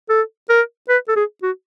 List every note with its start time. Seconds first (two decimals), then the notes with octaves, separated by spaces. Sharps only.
0.09 A4
0.49 A#4
0.89 B4
1.08 A4
1.16 G#4
1.43 F#4